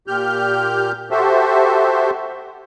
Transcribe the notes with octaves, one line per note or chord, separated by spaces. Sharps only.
A#2 G4 F6 G6
F#4 G4 A4 C5 E5